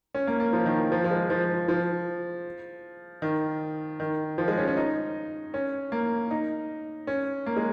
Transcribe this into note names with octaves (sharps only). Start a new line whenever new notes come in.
C#4
A#3
A#3
F3
D#3
F3
F3
G#3
F3
F3
D#3
D#3
F3
G#3
C#4
C#4
D#4
C#4
A#3
D#4
C#4
A#3
G#3